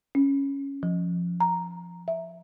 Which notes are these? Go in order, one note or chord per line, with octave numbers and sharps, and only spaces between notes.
C#4
F3
A#5
E5